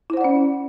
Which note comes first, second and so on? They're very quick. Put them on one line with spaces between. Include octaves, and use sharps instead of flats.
E4 C5 F#5 D5 C#4